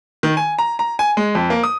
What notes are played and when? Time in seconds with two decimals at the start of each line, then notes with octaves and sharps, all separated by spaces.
0.23 D#3
0.37 G#5
0.59 A#5
0.79 A#5
0.99 G#5
1.17 G#3
1.35 F2
1.50 A#3
1.63 D#6